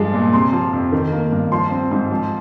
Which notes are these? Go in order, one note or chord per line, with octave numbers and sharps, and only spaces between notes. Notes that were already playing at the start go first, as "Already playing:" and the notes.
Already playing: G2 F3 G#3
A#2
C3 C6
F3
F2
D#3
A#3
G2
F3 C6
C4
G#2
F3